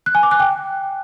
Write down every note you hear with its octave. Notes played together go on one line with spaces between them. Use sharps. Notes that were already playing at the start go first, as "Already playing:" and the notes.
F#6
G#5
D6
F#6
G5